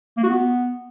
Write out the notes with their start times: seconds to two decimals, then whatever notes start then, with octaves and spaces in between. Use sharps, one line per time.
0.17 A#3
0.23 F#4
0.30 B3